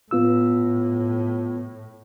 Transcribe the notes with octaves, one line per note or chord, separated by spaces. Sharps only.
A2 B3 F4 E6